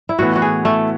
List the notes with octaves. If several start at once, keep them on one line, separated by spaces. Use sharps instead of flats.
E4
A2 E3 B3 F#4
F#4
G#4
A3